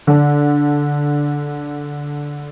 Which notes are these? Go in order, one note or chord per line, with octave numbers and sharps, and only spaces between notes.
D3 D4